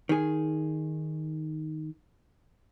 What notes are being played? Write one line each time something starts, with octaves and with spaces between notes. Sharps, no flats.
D#3 G#4